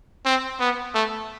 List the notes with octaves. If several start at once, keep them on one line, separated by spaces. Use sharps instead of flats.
C4
B3
A3